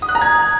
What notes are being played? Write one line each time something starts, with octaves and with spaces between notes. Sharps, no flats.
D#6
F#6
A#5
G#6